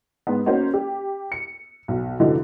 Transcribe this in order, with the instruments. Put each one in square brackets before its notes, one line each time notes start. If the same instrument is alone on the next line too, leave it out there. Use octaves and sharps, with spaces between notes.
[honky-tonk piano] G#2 B3
A#3 C#4 D#4 F#4 C5
G4
C#7
B1
F1 D3 E3 F3 D#4 F#4